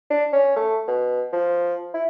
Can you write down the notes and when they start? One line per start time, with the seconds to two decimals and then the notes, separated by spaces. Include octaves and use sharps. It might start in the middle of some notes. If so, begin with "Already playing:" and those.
0.10 D4
0.33 C#4
0.56 A3
0.88 B2
1.33 F3
1.94 E4